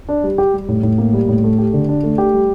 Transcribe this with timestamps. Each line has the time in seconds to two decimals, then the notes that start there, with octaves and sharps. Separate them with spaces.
0.09 D4
0.23 G3
0.38 G4
0.53 G3
0.68 A2
0.83 A2
0.98 A#3
1.13 G3
1.28 A2
1.43 A3
1.58 G4
1.73 D3
1.89 D4
2.03 A3
2.18 G4
2.34 G3